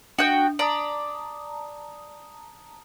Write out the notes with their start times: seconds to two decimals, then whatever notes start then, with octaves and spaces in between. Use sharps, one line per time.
0.19 D4 F#4 G5
0.59 D5 A5 A#5 D#6